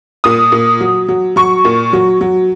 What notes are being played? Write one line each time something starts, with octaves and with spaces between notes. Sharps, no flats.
A#2 D#6
A#2
F#3
F#3
F#3 C#6
A#2
F#3
F#3